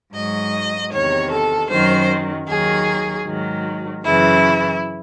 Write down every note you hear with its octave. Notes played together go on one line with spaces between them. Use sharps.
G#2 F#3 D#5
E2 C3 D#3 C#5
A4
F#2 D#3 F#3 C5
D#2 D#3 F#3 G#4
G#2 D#3 F#3
F#2 C#3 E3 E4